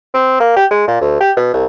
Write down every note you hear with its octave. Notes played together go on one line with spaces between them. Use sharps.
C4
A#3
G4
G#3
A#2
D2
G4
B2
C2